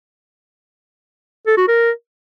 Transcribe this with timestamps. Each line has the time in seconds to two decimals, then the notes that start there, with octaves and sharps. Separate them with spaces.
1.46 A4
1.57 F#4
1.68 A#4